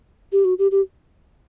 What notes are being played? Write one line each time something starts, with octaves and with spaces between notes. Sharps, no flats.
G4
F#4
G4
G4